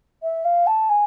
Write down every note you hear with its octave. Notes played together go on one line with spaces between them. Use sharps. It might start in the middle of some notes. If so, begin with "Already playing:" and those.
E5
F5
A5
G#5